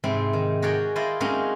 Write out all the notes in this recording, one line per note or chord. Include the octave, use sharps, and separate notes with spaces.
G#2 C3 C4 E4
D#3
F#4 G#4 A#4 C#5 D5 G5
E4 F4 C5 D5 D#5
F#3 G#3 A#3 C4 C#4 D#4